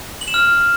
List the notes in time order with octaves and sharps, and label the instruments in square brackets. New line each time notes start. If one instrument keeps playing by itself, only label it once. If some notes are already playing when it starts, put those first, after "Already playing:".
[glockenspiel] F#7
E7
F6